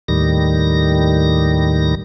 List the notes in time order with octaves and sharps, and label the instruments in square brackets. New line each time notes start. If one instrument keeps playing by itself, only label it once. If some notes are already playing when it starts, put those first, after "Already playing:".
[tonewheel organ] D#2 A2 D#3 G3 A#6